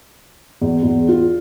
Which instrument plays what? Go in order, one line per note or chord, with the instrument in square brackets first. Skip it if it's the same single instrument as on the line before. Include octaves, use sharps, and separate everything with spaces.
[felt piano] E2
E2
F4